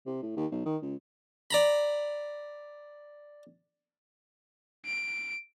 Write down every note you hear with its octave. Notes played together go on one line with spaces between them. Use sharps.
C3
A2
D#2
B1
D#3
C#2
D5 A#5 B5
D7